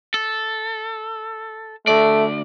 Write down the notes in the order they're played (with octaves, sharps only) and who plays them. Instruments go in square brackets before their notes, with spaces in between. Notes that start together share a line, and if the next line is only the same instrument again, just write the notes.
[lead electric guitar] A4
[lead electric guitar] D2 D5 [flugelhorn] A3